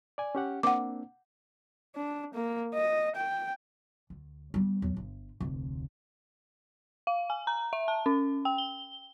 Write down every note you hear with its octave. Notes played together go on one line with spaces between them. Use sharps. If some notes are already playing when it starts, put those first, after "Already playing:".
D5 G#5
C#4 G4 F#5
A#3 C4 D4 F#5 D6
D4
A#3
D#5
G5
D2
G3 B3
E2 F#3
G1
F1 D2
F5
G#5
A#5
E5
A5
C#4
G5
G7